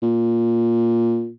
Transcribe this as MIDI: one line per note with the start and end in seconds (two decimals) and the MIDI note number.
0.02 1.30 46